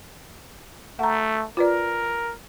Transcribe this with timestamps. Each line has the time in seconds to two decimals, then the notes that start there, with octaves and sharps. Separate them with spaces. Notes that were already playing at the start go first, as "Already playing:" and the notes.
0.99 A3 F#5 A#5
1.57 F4 A#4 B4 D5